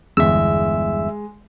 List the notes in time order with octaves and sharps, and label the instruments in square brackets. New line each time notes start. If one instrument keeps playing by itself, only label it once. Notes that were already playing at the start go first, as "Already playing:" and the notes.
[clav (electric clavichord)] G1 E2 [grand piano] G#3 [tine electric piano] E5 E6